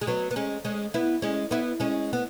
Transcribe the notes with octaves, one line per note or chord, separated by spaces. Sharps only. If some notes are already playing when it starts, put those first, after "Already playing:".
G#3
F#3 B3
B3
G#3 C#4
G#3 C#4
B3 E4
G#3 C#4
B3 E4
G#3 C#4
B3